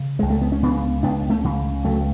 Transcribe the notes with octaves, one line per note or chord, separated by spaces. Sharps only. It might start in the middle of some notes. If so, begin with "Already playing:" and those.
Already playing: C#3
C#2 G#3
A3
B3
C#4
C#3 B3 D4
C#2 B3 D4
A3 C#4
C#3
C#2 F#3 A3